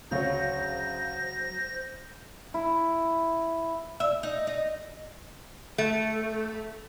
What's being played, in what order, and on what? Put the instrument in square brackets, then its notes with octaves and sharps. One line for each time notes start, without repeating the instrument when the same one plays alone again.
[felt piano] D2 C#3 F5 [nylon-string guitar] F#3 C#5 [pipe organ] C5 A#6
[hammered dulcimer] E4
[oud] E5
D#4
D#4
[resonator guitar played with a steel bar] A3